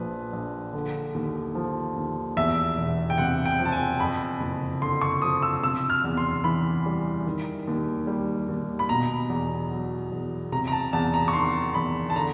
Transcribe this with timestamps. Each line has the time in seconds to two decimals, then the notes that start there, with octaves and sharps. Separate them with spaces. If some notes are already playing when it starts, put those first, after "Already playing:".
Already playing: A#1 A#2 F3 B4
0.33 A#1
0.73 D3
1.15 D#2
1.55 F3
1.96 D#2
2.37 E2 E5
2.77 E1
3.10 G5
3.18 C3 F#5
3.46 G5
3.59 F3
3.65 A5
3.72 G#5
4.00 F2 B5
4.41 F#1
4.81 D3 C6
5.01 C#6
5.22 F3 D#6
5.42 E6
5.63 C3 E6
5.90 F6
6.04 E2
6.17 C6
6.44 E3 B5
6.86 G3
7.26 D#3
7.67 D#2
8.07 G3
8.48 D#2
8.79 B5
8.89 B2 A#5
9.29 E2
9.71 F#3
10.12 E2
10.52 C3 A#5
10.67 A#5
10.72 A5
10.93 E2 A5
11.14 A#5
11.28 C#6
11.33 D#3 C6
11.74 E2 B5
12.10 A5
12.16 D3 A#5